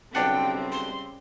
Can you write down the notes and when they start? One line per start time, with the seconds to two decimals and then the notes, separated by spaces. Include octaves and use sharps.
0.15 B1 C#3 G3 C4 D4 F#5 G5
0.72 C6